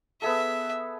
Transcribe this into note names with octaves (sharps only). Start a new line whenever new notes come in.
B3 G#4 A4 E5